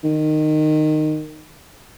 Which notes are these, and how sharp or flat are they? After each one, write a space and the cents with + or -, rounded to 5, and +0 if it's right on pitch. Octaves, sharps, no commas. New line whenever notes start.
D#3 -15